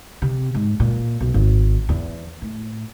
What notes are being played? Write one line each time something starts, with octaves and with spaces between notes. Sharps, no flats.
C3
G#2
A#2
B1
G#1
E2
A2